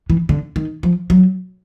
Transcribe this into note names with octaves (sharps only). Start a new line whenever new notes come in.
E3
D3
D#3
F3
F#3